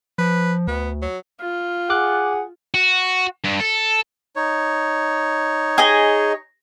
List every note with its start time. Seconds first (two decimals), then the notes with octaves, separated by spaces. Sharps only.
0.18 F3 B4
0.68 D2 B3
1.02 F#3
1.40 F4
1.90 G#4 F#5 D6 F#6
2.74 F#4
3.45 G2
3.61 A4
4.36 D#4 C#5
5.78 G#4 D#5